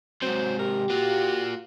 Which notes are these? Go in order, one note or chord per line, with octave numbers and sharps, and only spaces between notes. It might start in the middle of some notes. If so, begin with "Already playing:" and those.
G#2 C3 F#3 C5
G4 A#4
A#3 F4 F#4